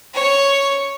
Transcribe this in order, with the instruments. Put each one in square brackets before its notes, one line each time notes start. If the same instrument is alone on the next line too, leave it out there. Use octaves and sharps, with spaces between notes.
[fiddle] C#5